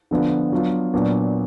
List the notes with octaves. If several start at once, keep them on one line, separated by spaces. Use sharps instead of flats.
D3 F3 B3 D4 F4
F#3 B3 D4 F4
A#2 F#3 B3 D4